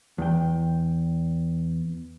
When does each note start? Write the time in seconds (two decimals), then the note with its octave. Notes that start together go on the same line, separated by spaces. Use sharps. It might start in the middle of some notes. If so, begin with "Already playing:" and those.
0.18 E2 G5